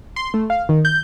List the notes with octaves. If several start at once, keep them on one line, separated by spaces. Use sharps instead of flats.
C6
A3
F5
D#3
G6